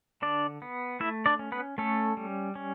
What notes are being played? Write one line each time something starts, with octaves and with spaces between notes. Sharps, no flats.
D3 D4 D5
B3
A3 E4 E5
D4 D5
C#4
B3 B4
A3 C#4 A4
G3
C#4